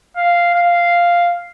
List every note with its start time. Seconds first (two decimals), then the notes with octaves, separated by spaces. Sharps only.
0.17 F5
0.54 F5